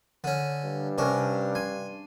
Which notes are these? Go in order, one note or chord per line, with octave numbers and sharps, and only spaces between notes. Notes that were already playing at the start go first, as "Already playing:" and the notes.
D3 C#4
G2
C3 C#4 D4 A#4
G#5 C6